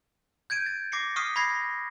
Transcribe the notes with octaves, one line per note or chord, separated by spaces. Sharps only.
G6 G#6 D7 D#7
A6
D6 A6 A#6 C7 C#7
C#6 D#6 F6 B6 C7 D#7
B5 C#6 G#6 A#6 C7